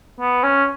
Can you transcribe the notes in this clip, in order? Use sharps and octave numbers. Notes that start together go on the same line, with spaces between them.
B3
C#4